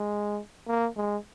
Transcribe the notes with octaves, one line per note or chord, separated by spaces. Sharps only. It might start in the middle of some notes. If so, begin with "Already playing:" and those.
Already playing: G#3
A#3
G#3